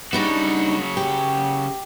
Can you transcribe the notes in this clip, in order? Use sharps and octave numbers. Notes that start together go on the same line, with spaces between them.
C#3 G3 D4 D#4 F#4
G4